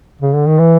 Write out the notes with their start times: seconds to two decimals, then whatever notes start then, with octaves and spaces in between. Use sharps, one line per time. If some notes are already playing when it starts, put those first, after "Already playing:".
0.21 C#3
0.34 D3
0.47 D#3
0.59 E3